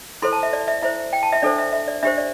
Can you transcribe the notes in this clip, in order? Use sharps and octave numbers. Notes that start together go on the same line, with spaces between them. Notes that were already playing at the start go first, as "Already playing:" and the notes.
E4 A4 C5 C6
A5
E5
D5
E5
E4 C5 E5
G5
A5
E5
D4 A4 C5 D5
E5
E5
D5
D4 G4 C5 E5
D5